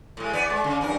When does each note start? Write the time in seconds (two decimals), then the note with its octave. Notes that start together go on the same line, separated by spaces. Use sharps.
0.17 A2 G#3
0.33 E2 B3 D5
0.50 G#3
0.64 C#3
0.81 E2 G2 A#4